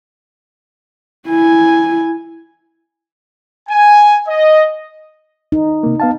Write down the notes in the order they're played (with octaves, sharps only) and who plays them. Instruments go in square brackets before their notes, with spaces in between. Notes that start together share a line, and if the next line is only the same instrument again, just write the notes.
[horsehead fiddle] E4 G#5
[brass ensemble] G#5
D#5
[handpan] D#4
[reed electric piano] C3 A#3
B3 F5 A5